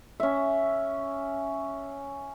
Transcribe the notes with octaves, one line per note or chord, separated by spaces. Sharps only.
C#4 E5